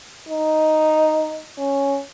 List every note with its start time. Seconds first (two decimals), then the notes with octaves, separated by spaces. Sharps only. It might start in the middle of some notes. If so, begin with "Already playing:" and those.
0.28 D#4
1.58 C#4